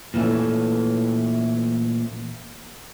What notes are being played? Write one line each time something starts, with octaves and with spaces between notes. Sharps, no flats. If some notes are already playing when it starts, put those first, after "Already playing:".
A#2 E3 A3 C#4